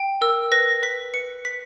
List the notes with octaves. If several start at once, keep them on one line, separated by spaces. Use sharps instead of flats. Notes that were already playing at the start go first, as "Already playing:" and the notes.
Already playing: G5
A#4 E6
B4 A#6
B4 B6
B4 C#7
B4 B6